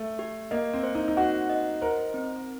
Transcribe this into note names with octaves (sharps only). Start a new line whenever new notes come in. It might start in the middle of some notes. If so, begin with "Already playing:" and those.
Already playing: A3
G4
A#3 D#5
C4
C5
D#4
D#4
F#4 F#5
D#5
A#4 C5
C4